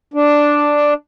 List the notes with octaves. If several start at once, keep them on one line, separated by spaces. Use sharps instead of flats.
D4